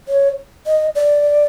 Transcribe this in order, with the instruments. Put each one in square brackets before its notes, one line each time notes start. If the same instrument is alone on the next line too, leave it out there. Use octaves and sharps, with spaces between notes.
[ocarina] C#5
D#5
D5